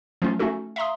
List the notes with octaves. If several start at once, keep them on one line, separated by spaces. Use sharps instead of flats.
F3 F#3 A3 C#4 F4
A3 C#4 D#4 F#4 A4
E5 F5 A#5 C6 D#6